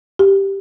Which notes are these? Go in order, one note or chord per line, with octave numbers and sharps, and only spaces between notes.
G4